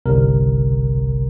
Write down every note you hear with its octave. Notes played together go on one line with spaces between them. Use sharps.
G1 C2 C3 A#4